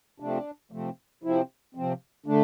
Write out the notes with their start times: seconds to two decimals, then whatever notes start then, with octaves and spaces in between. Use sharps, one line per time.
0.20 C3 F3 A3 C4 D4
0.71 C3 F3 A3 C4
1.23 C3 F3 C4 E4
1.75 C3 F3 C4
2.26 D3 A3 D4